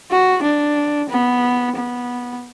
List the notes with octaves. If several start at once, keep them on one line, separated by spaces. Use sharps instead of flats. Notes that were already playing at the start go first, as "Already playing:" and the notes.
F#4
D4
B3
B3